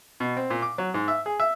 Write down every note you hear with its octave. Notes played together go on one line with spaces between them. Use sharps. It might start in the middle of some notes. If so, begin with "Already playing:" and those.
B2
C4
A#2
D6
F#3
G#2
E5
G#4
E5